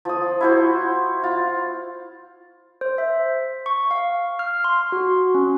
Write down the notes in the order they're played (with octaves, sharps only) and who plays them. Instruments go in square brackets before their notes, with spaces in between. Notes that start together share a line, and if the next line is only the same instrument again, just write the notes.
[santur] F3 D#6
E4 F#4 C5
F4
[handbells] C5
E5
C#6
F5
F6
C6
F#4
C#4